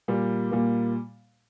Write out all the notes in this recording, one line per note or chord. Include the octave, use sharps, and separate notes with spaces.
A#2 G3 A#3
A#2 G3 A#3